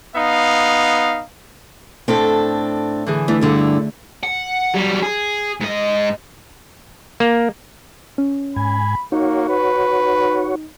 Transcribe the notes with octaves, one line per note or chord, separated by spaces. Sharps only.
B3 D#4 F5
A2 C4 D4 A4
D3 E3 G#4
E3 A3 D4
G2 D3 E4
F#5
F#3 G3
G#4
G#2 D#5
A#3
C#4
G#2 G#5 B5
A#3 D#4 F#4 C#5
B4